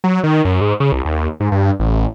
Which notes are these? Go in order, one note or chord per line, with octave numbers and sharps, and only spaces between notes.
F#3
D#3
F#2
G#2
C#3
C2
D#2
G#2
G2
A1